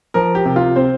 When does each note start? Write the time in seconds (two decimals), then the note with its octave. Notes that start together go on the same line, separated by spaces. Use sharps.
0.14 F3 A#4
0.35 G4
0.45 C3
0.56 F4
0.76 C4 C5